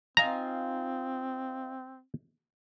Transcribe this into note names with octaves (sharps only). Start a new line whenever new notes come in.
C4 D#4 F4 G#5 A#5